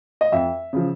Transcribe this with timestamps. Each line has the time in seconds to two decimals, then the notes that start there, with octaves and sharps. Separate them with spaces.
0.21 D#5
0.32 F2 E5
0.73 C#3 F3